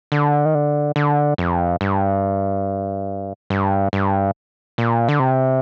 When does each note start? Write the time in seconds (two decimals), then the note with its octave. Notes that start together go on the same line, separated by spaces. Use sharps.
0.12 D3
0.45 D#3
0.55 D3
0.96 D3
1.38 F2
1.81 G2
3.50 G2
3.93 G2
4.78 A#2
5.09 D3
5.20 C3